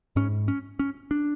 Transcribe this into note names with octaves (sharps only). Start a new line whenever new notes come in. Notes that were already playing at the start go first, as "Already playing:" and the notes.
G#2 C#4
C#4
C#4
D4